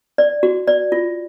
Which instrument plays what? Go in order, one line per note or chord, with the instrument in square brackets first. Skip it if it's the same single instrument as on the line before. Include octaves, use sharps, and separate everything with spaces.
[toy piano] D5
F#4
D5
F4